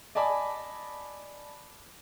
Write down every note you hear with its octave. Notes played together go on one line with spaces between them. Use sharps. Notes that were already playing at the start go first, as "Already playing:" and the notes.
D5 D#5 G#5 A5 B5 D6